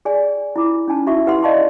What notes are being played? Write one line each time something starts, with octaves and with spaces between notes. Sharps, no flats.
G#4 D5 G#5
E4 F4 D6
C#4 D#4 G#5 A5
D#4 E4 F#4 E5 C#6
E4 G4 B4 F#5 C6
D5 D#5 F5 A5 C6 C#6